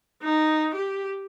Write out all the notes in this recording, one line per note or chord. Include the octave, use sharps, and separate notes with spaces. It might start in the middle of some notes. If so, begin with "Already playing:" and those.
D#4
G4